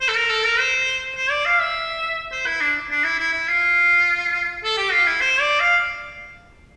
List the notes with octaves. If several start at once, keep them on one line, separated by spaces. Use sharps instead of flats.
C5
A4
A#4
A4
A#4
C5
C5
D5
F5
E5
C5
E4
D4
D4
E4
E4
E4
F4
A4
G4
F4
E4
C5
D5
F5